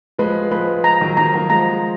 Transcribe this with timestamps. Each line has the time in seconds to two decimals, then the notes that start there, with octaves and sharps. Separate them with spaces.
0.18 F3 G#3 B4
0.51 F3 G#3 B4
0.84 A#5
1.01 D#3 F#3
1.17 D#3 F#3 A#5
1.33 F#3 A#3
1.50 F3 G#3 A#5